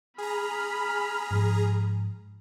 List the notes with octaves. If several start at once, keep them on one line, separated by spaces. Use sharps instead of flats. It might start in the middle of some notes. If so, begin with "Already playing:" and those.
G#4 A#5 B5 F6
G#2 F3